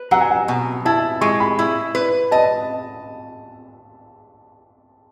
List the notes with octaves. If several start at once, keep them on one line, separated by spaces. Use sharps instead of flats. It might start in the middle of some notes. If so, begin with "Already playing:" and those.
Already playing: B4
F#3 F#5
G#5
F#5
B2
E4 A5
G#3 C#6
B5
E4
B4
D#5 A5